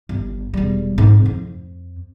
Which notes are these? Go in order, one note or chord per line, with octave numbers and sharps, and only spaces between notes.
G1
E1 G3
G#2 C4
F2